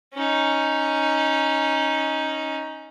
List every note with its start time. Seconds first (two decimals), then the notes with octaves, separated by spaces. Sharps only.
0.14 C#4 D#4